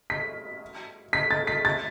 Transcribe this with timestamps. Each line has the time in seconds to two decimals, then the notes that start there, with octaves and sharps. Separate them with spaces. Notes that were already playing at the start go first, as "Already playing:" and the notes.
0.10 B6
1.13 B6
1.31 A6
1.47 B6
1.65 A6